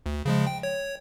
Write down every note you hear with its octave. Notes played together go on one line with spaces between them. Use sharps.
D2
C#3 F3 G#3
G5
C#5